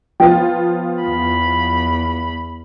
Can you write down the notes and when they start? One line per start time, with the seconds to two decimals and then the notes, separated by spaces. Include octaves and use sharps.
0.20 F3 B3 F4 G5
1.02 E2 B5